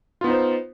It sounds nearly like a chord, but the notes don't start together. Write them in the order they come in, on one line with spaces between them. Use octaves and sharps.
F4 B3 D#4 C5